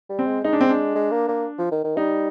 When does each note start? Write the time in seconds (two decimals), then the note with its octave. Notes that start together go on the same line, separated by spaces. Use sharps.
0.10 G3
0.19 C4
0.27 G#3
0.44 G#3 D#4
0.53 D4
0.61 C4
0.69 D4
0.95 G#3
1.11 A#3
1.28 A#3
1.58 F3
1.71 D#3
1.84 D#3
1.97 G3 D#4